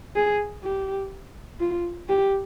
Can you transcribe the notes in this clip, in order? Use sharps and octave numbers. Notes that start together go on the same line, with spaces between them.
G#4
G4
F4
G4